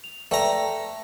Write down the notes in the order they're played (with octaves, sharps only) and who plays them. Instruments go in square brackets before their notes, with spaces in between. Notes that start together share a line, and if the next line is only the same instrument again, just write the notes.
[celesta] F7
[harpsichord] A3 A#5 [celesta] B4 D5 G5